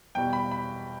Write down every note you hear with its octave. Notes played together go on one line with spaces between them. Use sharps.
E2 B2 G3 G5
B5
B5